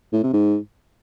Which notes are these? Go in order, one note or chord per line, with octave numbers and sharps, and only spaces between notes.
A2
C3
G#2